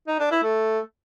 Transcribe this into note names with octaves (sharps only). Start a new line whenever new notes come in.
D#4
D4
E4
A3